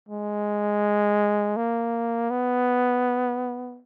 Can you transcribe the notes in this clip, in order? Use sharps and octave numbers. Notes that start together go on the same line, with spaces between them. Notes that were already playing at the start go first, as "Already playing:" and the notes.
G#3
A#3
B3